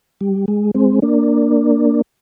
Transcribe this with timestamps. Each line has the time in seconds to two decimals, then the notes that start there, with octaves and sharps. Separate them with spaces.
0.21 G3
0.48 G#3
0.74 G#3 C4
1.02 A#3 D4